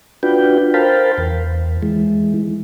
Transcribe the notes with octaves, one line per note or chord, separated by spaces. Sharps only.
D4 F4 F#4 B4 G5
A#4 C5 F5 G5 A5 B5
E2
E3 G#3